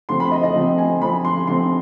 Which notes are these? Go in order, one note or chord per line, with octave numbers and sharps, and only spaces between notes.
D3 F3 C4 C6
B5
D#5
D#5
D3 F3 C4
G#5
D3 F3 C4 B5
C6
D3 F3 C4 C6